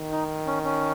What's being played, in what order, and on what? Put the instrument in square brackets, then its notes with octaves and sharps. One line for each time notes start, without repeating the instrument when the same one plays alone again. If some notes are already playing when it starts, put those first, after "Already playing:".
Already playing: [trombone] D#3
[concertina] D#4
C#4
C#4